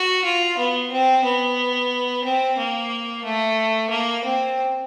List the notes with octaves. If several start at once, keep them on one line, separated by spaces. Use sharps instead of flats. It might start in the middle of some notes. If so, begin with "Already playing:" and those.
Already playing: F#4
F4
B3
C4
B3
C4
A#3
A3
A#3
C4